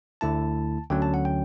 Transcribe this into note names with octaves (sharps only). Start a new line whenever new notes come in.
D2 D3 A3 E4 A5
D2 D3 F#3 C#4 G5
A5
F#5
G5